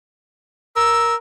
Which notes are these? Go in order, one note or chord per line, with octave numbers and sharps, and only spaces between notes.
A#4 E6